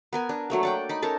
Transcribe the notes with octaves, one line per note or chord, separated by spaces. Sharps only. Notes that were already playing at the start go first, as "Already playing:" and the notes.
B3 A#4 G#5
D4
F#3 A3 A#3
D5 F#5 G5
D#4 B5
C#4 A4 A#4 A5